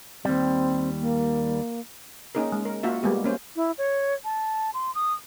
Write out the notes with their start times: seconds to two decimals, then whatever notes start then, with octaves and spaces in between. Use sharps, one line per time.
0.25 D#2 G3 C4
1.01 A#3
2.35 A#3 C#4 D#4 G#4 A#4
2.52 G#3
2.65 A#4
2.83 A#3 F4 F#4 E5
3.03 G3 G#3 A#3 B3 G4
3.24 A#3 C#4 C5
3.56 E4
3.78 C#5
4.25 A5
4.74 C6
4.95 D#6